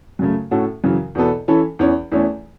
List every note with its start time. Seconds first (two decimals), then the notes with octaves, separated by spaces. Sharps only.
0.19 F#2 C#3 A3
0.51 A2 A3 C#4 F#4 A4
0.84 F#2 C#3 E3
1.15 E2 B2 B3 A4
1.48 E3 C#4 E4 A4
1.79 E2 E3 C#4
2.12 E2 E3 A3 C#4